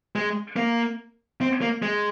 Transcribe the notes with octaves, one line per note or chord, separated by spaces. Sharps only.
G#3
A#3
C4
A#3
G#3